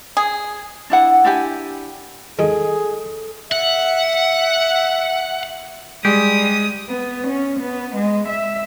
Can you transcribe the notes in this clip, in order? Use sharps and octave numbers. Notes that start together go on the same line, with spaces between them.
G#4
D4 E4 F#5
D4 E4 G4 G#5
D#3 G#3 G#4 A4
E5 F#5
G3 G#3 G4 D#6
B3
C#4
B3
G#3
E5